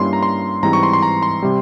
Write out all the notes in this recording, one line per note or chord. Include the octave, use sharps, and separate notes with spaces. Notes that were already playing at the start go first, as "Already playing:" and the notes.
Already playing: G2 G3 A#3 C#4 E4 C6
A#5
C6
G#2 E3 G3 C4 E4 A#5
C#6
C6
C6
A#5
C6
C3 G3